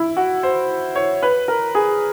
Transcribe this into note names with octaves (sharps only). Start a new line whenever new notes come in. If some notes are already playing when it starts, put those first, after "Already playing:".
Already playing: E4
F#4
C5
C#5
B4
A#4
G#4